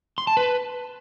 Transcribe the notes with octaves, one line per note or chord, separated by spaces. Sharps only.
C6
A5
B4